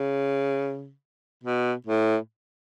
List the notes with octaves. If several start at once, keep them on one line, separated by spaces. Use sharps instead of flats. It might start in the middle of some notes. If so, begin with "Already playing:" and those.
Already playing: C#3
B2
A2